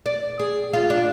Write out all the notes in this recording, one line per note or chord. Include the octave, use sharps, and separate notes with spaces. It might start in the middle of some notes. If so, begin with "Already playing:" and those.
D5
G#4
F4
D4